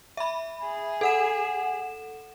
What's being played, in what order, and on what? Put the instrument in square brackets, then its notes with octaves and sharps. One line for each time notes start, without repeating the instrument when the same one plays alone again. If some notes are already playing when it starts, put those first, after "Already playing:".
[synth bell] E5 B5
[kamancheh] G#4
[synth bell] A4 F#5 E7